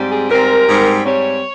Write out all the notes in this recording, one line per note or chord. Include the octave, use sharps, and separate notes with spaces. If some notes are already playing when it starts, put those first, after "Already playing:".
Already playing: G#2 G3 C4
G#4
G#2 G3 C4 A#4
G#2 G3 C4
G#2 G3 C4 C#5